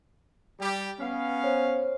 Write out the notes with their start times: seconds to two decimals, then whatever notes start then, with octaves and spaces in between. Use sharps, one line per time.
0.60 G3 G4
0.99 B3 C#4 F5
1.44 C5 C#5